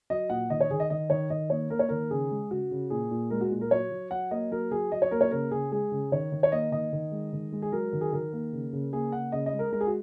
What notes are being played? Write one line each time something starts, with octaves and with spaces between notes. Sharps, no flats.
F#3 D#5
A#2 F#5
D#3 D#5
C#5
D#3 G#4
D#5
D#3 D#5
D#3 C#5
D#3 D#5
A#3 C#5
A#3 A#4
C#5
D#3 A#4
C#3 G#4
G#3
C#3 F#4
C#3
A#2 G#4
A#2
G#3 A#4
F#4
A#2
A#4
F#3 C#5
F#3
F#3 F#5
A#3 D#5
F#3 A#4
F#3 G#4
F#3 D#5
C#5
A#3 A#4
C#5
C#3 A#4
C#3 G#4
G#3 G#4
C#3
D#3 C#5
D#3
C#5
A#3 D#5
D#3 D#5
D#3
G#3
D#3
G#3
G#4
F#3 A#4
D#3
G#4
D#3 A#4
A#3
C#3
C#3
A#3 G#4
C#3 F#5
C#3 D#5
D#5
G#3
A#4
G#3 A#4
G#4
F#4